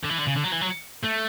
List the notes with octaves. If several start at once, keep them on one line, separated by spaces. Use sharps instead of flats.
D3
E3
D3
C#3
D3
F#3
E3
F#3
A3